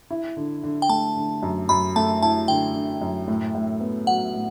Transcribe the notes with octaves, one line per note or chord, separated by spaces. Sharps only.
E4
D3
D3
G5
A3 A5
D3
F#2
F#2 B5
A3 A5
E4 A5
D3 G5
D3
F#2
A2
A2
B3
F#3 F#5
A2